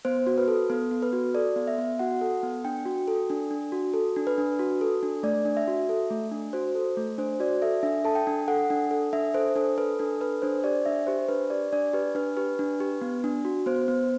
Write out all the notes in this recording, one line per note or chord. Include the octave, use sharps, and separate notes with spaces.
B3 C5
F#4
B4
A4
B3 A4
B3
B4
F#4
A4 D5
B3
E5
B3
F#4 F#5
A4
B3
D4 G5
F#4
A4
D4
D4
F#4
A4
D4
B4
D4
F#4
A4
D4
A3 D5
D4
E5
F#4
A4
A3
D4
F#4 C5
A4
A3
D4 C5
F#4 D5
A4 E5
D4 E5
A4 A5
G5
D4
A4 F#5
D4
A4
D4 E5
A4 C5
D4 A4
A4 B4
D4 A4
A4 B4
D4 C5
G4 D5
D4 E5
G4 C5
D4 B4
G4 D5
D4 D5
G4 B4
D4 B4
G4 B4
D4
G4
B3
D4
F#4
B3 C5
B3